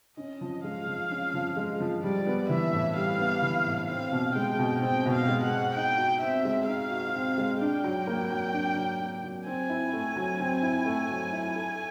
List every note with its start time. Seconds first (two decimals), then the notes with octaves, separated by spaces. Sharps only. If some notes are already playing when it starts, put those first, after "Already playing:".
0.17 C#4 D#5
0.41 F3
0.64 G#3 F5
0.87 F3
1.10 C#4
1.34 F3
1.57 G#3
1.80 F3
2.03 G3 D5
2.27 B3
2.49 E3 E5
2.73 A2
2.96 G3 F5
3.19 B3
3.42 E3
3.66 A2
3.89 C4 F5
4.12 B2
4.35 G#3 G5
4.59 B2
4.81 C4 G5
5.06 B2
5.13 F5
5.28 G#3
5.43 F#5
5.52 B2
5.75 D#4 G5
5.98 F#4
6.21 C4 E5
6.45 G#3
6.67 D#4 F5
6.91 F#4
7.14 C4
7.38 G#3
7.60 D4 G5
7.84 F#3
8.07 A#3
8.30 F#3
8.53 D4
8.76 F#3
9.00 A#3
9.23 F#3
9.46 C4 G#5
9.69 E4
9.93 A3
10.16 F#3
10.40 C4
10.63 E4
10.86 A3
11.09 F#3
11.32 E4
11.56 A4